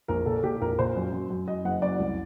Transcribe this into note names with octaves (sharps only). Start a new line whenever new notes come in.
A#1 A#4
A#2 A4
A#2 G4
A#1 A#4
A#2 C5
F#2
F#2
F#2
F#2 D#5
F#1 F#5
F#2 D5
C2